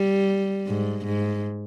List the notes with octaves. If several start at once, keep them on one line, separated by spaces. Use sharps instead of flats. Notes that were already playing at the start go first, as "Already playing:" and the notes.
Already playing: G3
G#2
G#2